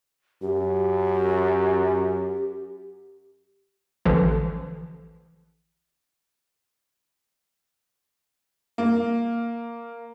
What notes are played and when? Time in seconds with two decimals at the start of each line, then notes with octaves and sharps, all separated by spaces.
0.42 F#2 G4
4.05 A1 D3 E3 F3
8.78 A#3